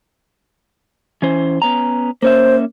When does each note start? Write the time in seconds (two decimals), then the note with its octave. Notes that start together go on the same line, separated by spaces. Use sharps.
1.22 E3 C#4 C5
1.62 B3 C#4 A#5
2.22 A#3 C#4 C5 E5